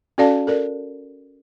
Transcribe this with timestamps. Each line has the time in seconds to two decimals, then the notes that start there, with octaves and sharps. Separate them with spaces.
0.18 C#4 F#4 A4 D5 F5 A5
0.47 A4 A#4 D5